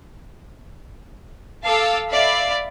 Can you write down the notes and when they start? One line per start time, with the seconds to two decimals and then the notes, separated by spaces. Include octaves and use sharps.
1.63 A4 F5 A5 D6 E6
2.10 D5 E5 F5 B5